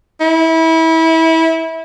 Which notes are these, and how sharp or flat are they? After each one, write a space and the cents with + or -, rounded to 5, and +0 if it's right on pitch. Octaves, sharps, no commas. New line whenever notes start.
E4 -25